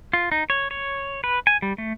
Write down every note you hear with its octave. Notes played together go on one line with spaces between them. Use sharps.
F4
D#4
C#5
C#5
B4
G#5
G3
A3